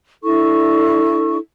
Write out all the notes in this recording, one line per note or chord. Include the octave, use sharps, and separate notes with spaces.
D4 E4 A4 C#6